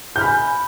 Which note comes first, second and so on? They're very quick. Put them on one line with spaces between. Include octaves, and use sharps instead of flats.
G6 F6 B5 G#5